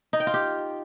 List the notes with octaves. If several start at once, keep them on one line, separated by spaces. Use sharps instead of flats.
D#4
G5
F4
G4